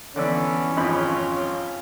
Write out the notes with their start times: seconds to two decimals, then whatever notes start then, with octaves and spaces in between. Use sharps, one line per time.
0.16 D3 E3 B3 C#4 D5 E6
0.77 G#1 F2 F4 B5